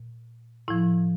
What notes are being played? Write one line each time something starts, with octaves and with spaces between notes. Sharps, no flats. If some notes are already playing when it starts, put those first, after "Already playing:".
Already playing: A#2
A2 F3 E4